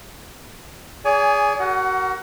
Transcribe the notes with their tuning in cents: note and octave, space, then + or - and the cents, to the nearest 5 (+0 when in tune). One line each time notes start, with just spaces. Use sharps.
G#4 -5 D5 -45 G#5 +5
F#4 +30 A#4 +0 F#5 +0